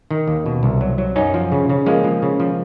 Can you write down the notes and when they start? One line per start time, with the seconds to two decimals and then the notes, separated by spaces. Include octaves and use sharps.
0.11 D#3
0.28 D#2
0.46 B2
0.63 C2
0.81 F#3
0.98 F#3
1.16 F#2 C#4 D#4
1.34 F3
1.52 C#3
1.70 C#3
1.86 F3 G#3 A#3
2.04 F3
2.22 C#3
2.40 F3